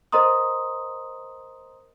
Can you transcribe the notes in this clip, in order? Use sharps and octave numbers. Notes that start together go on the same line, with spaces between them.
A#4 C5 D#5 A#5 C6 D#6